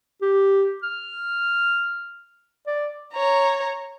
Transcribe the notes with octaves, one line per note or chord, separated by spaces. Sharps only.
G4
F6
D5
C#5 A#5